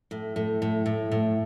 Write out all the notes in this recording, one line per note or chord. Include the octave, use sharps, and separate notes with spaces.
A2
A2
A2
A2
A2